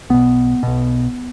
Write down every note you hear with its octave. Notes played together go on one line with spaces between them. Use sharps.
B1 B2 B3
B1 B2